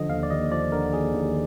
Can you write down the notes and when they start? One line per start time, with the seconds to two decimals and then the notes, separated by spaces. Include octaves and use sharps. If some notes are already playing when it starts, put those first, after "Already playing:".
Already playing: D3 F3 D#5
0.09 D#2 F5
0.23 D5
0.30 D#2 D#5
0.52 F3 D5
0.72 D3 A#4
0.93 D#2 G#4
1.14 D#2